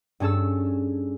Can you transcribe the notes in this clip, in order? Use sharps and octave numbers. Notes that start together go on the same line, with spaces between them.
G2 C#4 G#4 A4 E6